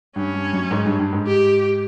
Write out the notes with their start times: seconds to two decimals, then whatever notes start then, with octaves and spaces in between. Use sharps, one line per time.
0.16 G2 C#4
0.34 G2
0.53 F#2
0.71 G#2
0.86 G2
0.99 G2
1.13 G#2
1.27 G4